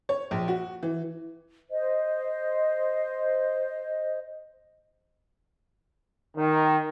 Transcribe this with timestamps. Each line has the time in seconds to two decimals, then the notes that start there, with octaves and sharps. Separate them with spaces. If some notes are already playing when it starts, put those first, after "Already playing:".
0.09 C#5
0.31 A#1
0.48 F#4
0.83 E3
1.70 C5 D#5
6.35 D#3